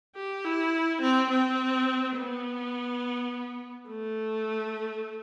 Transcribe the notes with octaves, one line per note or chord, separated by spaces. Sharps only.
G4
E4
C4
C4
B3
A3